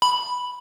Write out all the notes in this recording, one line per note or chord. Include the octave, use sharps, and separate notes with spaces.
B5